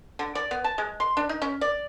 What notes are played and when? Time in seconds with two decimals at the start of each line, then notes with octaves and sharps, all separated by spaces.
0.19 D3
0.35 D5
0.51 B3
0.64 A5
0.78 G#3
1.00 C6
1.17 D4
1.29 D#4
1.42 C#4
1.61 D5